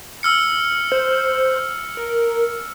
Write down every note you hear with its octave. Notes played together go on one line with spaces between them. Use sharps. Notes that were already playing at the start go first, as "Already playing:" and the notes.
E6 F6 C#7
C5
A#4